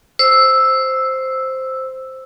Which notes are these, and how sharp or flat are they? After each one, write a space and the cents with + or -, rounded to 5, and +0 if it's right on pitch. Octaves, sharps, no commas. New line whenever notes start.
C5 +0 E6 +0